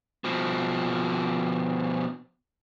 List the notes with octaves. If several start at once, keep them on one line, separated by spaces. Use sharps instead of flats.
B2 F3